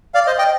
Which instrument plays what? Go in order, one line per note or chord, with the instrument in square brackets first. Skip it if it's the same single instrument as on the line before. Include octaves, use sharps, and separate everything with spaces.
[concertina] D5 F5
C5 D#5
D#5 G5